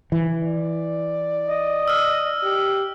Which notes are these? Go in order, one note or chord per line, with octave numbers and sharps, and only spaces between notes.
E3
D5
D#5
E6 F6
G4